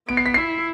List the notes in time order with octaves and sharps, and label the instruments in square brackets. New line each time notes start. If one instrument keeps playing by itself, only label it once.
[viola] B3 [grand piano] D7
[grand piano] C7
B6
[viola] E4 [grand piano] C7